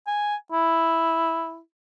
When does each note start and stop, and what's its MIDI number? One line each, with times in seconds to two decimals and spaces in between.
0.07 0.35 80
0.52 1.59 64